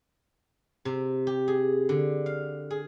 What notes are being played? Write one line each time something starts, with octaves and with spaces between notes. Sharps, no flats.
C3
G4
G#4
D3
F5
G#4